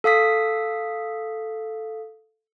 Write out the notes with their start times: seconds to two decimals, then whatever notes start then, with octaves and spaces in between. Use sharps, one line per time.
0.04 A4 F5 D#6 B6